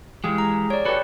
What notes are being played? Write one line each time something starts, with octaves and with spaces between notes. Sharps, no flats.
E3 G#3 G4 G#4 F5
A#5
C#5 D5
F#4 G4 A4 B4